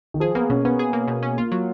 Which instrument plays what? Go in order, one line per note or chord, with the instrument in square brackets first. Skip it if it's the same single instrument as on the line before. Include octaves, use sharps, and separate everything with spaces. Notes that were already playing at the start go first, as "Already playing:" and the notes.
[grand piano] D#3
[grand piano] F3 [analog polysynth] G#4
[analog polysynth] A#3 [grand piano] B3
[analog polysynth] B2 [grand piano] C#4
[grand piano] B3 [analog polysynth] C#4
[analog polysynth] G#4
A#3
B2
C#4
[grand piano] A#3 [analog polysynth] F4
[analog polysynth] F#3